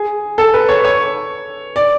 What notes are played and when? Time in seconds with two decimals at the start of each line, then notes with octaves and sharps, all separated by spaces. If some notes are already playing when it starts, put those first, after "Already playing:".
Already playing: G#4
0.38 A4
0.54 B4
0.69 C#5
0.84 C#5
1.76 D5